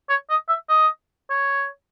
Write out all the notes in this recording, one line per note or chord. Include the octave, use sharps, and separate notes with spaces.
C#5
D#5
E5
D#5
C#5